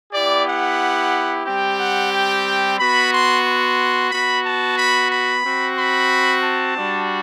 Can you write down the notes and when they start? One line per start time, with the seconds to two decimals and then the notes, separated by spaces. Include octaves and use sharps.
0.13 B3 E4 G4 D5
0.47 F#5
1.46 G3 C4 G4 G5
1.79 F#5
2.13 G5
2.79 B3 F#4 B5
3.13 C6
3.45 C6
4.11 B3 F#4 B5
4.45 A5
4.77 B5
5.11 B5
5.44 C4 F#4
5.77 B5
6.43 A5
6.77 G3 D4 F#4